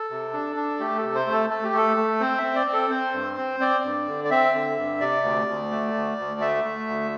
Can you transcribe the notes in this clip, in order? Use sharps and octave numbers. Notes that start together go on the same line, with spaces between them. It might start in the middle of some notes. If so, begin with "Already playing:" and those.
Already playing: A4
C3
D4
D4
A3 G4
C3 A4
C5
A3
A4
A3 A4
G4
A3 A4
A3
C4 C5
C4 E5
D5
C4
A4
C4 C5
G2
C4
C4 D5
G2
D3
D5
C4 E5
D3
G2
C3 D5
D2
D2
A3
D2
D2
A3 E5
A3
D2